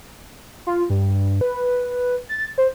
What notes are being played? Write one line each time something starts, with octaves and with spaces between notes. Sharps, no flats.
F4
G2
B4
A6
C5